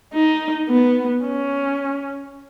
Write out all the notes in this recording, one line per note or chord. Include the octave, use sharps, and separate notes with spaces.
D#4
B3
C#4